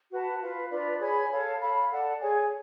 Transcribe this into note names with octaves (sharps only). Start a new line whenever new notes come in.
F#4 B4 F#5 A5
F4 B4 F5
D4 F4 B4 D5
G#4 C#5 G#5 B5
A4 C#5 F5
A4 F5 B5
A4 D5 F#5
G#4 C#5 G#5